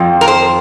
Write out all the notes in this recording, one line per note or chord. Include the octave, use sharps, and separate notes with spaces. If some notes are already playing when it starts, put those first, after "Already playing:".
Already playing: F2 F3
A#4
C5